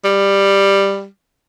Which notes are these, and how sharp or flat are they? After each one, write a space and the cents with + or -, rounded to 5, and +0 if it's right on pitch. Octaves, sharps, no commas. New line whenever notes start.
G3 +10